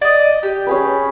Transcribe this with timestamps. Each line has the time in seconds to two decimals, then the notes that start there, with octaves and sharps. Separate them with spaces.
0.01 D5 D#5
0.43 G4
0.67 C#4 G#4 B4